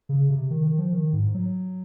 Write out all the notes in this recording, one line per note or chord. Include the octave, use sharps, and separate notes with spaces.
C#3
C3
D#3
D#3
F3
D#3
G#2
F#3